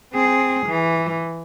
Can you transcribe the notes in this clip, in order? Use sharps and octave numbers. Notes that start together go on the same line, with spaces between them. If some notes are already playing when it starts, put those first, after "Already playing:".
C4 G#4
E3